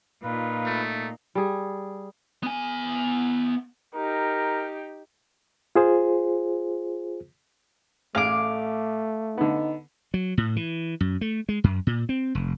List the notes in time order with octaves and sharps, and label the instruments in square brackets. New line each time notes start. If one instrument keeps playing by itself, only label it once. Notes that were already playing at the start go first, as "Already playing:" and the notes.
[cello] A#2 D#4 [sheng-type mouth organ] F4 B4
[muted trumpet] A3
[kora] G3 G#4
[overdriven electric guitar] B3 G#5
[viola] D#4 G4 [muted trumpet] A#4
[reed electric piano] F4 G#4 C5
[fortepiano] A1 G#4 F6 [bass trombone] A3 [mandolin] F5 D6
[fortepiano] D3 B3 [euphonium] D#4
[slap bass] F#3
A2
E3
F#2
A3
G#3
F#2
A#2
C4
F1